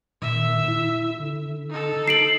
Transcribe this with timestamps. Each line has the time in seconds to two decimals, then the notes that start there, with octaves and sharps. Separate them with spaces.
0.22 A#2 D#3 E5
0.68 E4
1.20 D3
1.70 D#4 A4
2.08 C7 D7 F#7